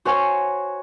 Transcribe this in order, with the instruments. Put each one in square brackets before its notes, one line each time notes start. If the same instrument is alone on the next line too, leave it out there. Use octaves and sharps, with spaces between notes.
[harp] F#4 C5 C#5 G#5 C#6